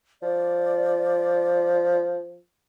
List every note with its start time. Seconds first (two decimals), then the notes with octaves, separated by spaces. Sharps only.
0.23 F3 D5